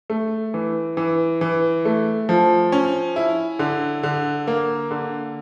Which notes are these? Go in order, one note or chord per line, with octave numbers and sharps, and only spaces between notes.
A3
E3
E3
E3
A3
F3
C#4
E4
D3
D3
A#3
D3